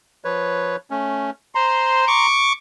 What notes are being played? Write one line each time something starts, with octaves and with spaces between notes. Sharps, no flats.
F3 B4 C#5
A3 C#4
C5 A#5 C6
C#6 D6